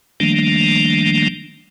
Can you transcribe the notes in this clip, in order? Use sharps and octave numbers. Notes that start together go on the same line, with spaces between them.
D#3 F3 G3 A3 A#3 D4